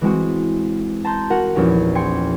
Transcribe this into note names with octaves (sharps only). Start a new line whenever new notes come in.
E3 G#3 C4 F#4
A5 A#5 C6 G6
F#4 A#4 F#5
A#1 E2 F3 C#4 D#4 G4
G5 G#5 C6 C#7